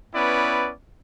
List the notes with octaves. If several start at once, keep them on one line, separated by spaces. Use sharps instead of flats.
B3 C#4 E4 B4 D5